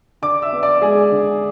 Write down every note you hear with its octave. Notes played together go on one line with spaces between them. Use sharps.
D3 D5 D6
E5 E6
B3
D5 D6
G#3 G#4 G#5
D3